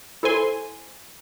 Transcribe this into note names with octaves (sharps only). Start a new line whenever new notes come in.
E4 A4 C5 G#5 C6